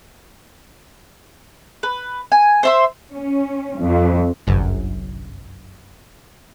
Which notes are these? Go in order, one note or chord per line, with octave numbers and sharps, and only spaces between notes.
B4
G#5
C5 E5 C6
C#4
F2
G1 C2 F#2